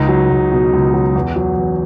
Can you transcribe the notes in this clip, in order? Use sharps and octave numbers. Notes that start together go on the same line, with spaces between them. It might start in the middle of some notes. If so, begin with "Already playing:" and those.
Already playing: C#2 D#4
F#3
C#2
B2
C#2
F#3
E2
F#3
E2